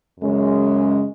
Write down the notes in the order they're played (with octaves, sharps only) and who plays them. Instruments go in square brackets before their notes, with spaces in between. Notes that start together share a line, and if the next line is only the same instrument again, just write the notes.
[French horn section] F#2 C#3 G#3 C#4